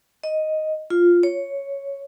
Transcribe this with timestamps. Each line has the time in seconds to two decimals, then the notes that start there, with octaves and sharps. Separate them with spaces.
0.23 D#5
0.90 F4
1.23 C#5